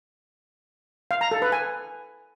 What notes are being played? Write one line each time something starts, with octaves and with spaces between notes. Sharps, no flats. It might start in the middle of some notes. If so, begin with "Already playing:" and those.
F5
A#5
A4
B4
G#5